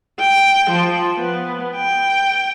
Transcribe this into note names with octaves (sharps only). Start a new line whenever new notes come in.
G5
F3
B3
G5